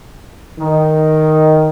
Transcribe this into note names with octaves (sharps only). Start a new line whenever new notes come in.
D#3